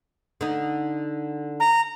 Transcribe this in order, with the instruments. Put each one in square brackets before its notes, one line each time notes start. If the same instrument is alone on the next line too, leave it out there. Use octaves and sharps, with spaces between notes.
[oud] D3 D#4
[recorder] A#5